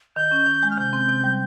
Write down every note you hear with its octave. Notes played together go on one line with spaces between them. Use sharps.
D#3 G6
C#4
D#3
G#3
F6
C3 G6
C4
C3
G3